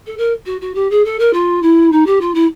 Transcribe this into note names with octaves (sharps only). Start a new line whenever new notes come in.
A4
A#4
F#4
F#4
G4
G#4
A4
A#4
F4
E4
D#4
G4
F4
E4